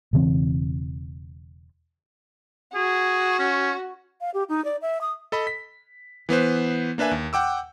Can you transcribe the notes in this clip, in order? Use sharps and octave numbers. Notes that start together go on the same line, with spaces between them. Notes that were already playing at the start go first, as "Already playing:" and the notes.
E1 C#3 E3 C4
F#4 G#4
C#4
F5
G4
D#4
D5
E5
D#6
A4 D#5 B5
B6
E3 B3 B4 C5
A#3 D4 B4 E5 G#5
D#2
F#5 G5 D6 E6